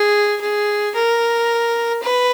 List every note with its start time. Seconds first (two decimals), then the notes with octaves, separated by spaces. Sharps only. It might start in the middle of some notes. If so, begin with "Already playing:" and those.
Already playing: G#4
0.41 G#4
0.95 A#4
2.03 B4